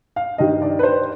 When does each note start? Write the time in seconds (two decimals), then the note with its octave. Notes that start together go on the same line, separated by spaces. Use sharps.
0.16 F5
0.38 G2 D#3 G3 D#5
0.62 D5
0.79 B4
0.83 C5